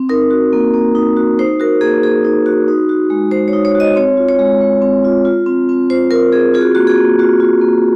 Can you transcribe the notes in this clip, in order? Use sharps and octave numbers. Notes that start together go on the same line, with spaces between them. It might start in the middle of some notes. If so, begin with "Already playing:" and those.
Already playing: C4
D#4 A#4
F#4
A#3
A#3
D#4
F#4
D#4 C5
F#4 A#4
A#3 G#4
A#3 G#4
D#4
F#4
D#4
F#4
G#3
G#3 C5
C#5
D#4
C#5
F#4 D#5
C4 C#5
F4
C#5
G#3
G#3
C4
F4
F4
C4
C4
F4 C5
F4 A#4
C4 G#4
F4 G#4
F#4
A#3 F#4
G#4
A#3
F4 F#4
F4
A#3